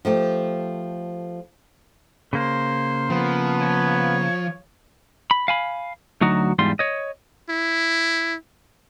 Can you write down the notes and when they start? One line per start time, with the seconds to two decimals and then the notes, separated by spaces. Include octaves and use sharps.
0.05 F3 A3 G4
2.33 C#3 A#3 C5
3.10 F3 B3
3.61 C#5
5.31 B5
5.48 F5 G#5 B5
6.21 D2 F#3 D#4 F#4
6.59 E2 G#2 G3 F4 C6
6.79 C#5 D#5
7.50 E4